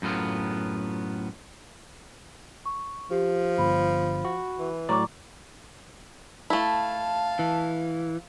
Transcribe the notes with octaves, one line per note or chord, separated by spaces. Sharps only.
F#2 A2 B3 F4
C#6
F3 G4
G1 B5
F#4
E3
A2 F#3 D5 A#5 C#6 D6
A3 E4 F5 A5
E3